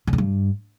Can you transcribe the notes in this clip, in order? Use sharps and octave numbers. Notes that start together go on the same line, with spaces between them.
C#3
D3
G2